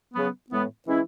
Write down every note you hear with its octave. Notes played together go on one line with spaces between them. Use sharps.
C#3 F#3 B3
A2 E3 G#3 B3
E3 G#3 C#4 E4